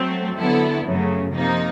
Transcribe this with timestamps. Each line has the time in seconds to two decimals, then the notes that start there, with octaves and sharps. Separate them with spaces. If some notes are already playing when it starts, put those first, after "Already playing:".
Already playing: F#3 A3 C4
0.36 D3 F#3 B3 E4 A4
0.85 F#2 C#3 F#3 A3
1.32 C3 F3 A#3 D#4